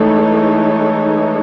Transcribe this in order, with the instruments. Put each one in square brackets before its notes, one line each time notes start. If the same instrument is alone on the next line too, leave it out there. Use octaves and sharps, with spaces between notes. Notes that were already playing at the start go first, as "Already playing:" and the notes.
Already playing: [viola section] E3 G#3 D#4 A4 C#5 [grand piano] A3